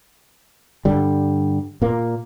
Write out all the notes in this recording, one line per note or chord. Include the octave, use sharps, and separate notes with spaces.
G2 D3 G3
A#2 A#3